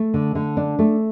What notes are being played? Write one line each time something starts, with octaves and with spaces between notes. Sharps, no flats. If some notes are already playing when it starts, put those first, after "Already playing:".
Already playing: A3
D3
D3
D4
A3